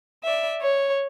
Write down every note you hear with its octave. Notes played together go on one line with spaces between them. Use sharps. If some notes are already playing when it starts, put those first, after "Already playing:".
D5 E5
C#5